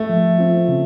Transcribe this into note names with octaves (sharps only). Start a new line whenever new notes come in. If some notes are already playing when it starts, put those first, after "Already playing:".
Already playing: A3
F3
C4 F4
C#3